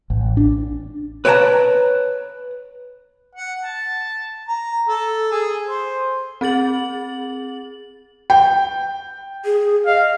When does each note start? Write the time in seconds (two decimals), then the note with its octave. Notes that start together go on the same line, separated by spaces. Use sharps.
0.10 A1
0.37 D4
1.25 B4 C#5 F5 G5 A5 A#5
3.35 F#5
3.63 A5
4.48 A#5
4.88 A4
5.32 G#4
5.66 C5
6.41 C4 G#4 A6 F#7
8.30 G5
9.45 G#4
9.86 D#5 F5